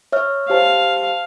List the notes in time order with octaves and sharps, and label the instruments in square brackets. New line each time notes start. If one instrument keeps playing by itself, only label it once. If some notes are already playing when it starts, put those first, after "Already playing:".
[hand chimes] C#5 E5 F6
[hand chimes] G4 C5 A5 [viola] F5